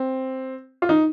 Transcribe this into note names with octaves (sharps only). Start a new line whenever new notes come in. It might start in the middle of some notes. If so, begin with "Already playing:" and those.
Already playing: C4
F4
D#4